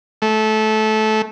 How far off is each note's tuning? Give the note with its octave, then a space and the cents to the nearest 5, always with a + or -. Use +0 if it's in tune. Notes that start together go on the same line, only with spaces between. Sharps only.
A3 -20